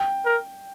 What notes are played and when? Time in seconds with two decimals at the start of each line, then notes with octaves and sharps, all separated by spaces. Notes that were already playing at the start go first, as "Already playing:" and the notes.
Already playing: G5
0.25 A#4